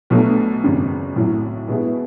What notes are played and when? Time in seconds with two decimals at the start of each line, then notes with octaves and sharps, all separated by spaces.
0.10 B1 B2 F#3 A3 D4
0.64 G#1 F#2 C#3
1.16 B1 A2 F#3
1.69 B2 G#3 B3 E4 G#4